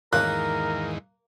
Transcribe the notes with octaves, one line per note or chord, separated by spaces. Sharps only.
E2 G#2 D#3 A#3 A#4 F#6